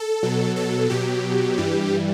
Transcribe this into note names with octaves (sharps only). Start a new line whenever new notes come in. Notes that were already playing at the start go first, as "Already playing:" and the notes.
Already playing: A4
B2 F#3
A4
B2 F#3 G4
G2 E3 G3